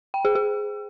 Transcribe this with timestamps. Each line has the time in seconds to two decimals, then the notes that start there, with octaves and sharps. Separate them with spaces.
0.14 G5
0.25 G#4
0.35 G#4